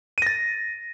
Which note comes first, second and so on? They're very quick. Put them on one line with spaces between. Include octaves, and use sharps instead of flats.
D#7 A#6 A6